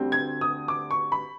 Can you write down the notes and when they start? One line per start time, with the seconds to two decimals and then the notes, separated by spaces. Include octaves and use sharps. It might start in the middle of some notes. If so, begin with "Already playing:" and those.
Already playing: D2 D3 G3 C4
0.12 G#6
0.41 D#6
0.68 D6
0.91 C#6
1.12 B5